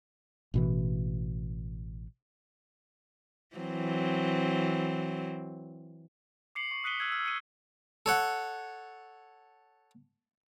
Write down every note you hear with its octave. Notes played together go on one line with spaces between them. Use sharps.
A1 B2 E3
E3 F#3 C4
D6 C7 C#7 F#7
C#6
D#6 F#6 B6 C#7 D#7 G7
E6 F#6 G#6 F#7
E6 F6
C#7 D#7
A4 C#5 F#5